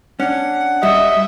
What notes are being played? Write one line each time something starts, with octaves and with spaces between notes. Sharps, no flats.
C#4 D4 F#5
G3 D#5 E5